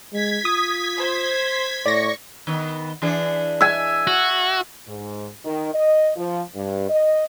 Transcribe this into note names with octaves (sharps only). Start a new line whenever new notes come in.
G#3 G#6 B6
F4 D#6
C5
A2 D5 C#6 A#6
D#3 B3
E3 D4 G#4
E5 G#5
F#4
G#2
D#3
D#5
F3
G2
D#5